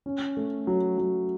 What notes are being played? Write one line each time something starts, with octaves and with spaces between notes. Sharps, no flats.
C#4
A3
F#3
F#3